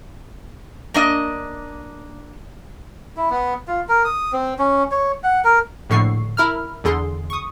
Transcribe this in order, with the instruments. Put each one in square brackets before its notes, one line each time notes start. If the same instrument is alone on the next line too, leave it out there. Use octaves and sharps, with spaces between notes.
[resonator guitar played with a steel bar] A#3 D4 D#5
[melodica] E4
B3
F4
A#4
D#6
C4
C#4
C#5
F#5
A#4
[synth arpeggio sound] A#1 A2 D3 C#6 C7
E4 A#4 F6
E2 D3 G#4 C6
C#6 D#6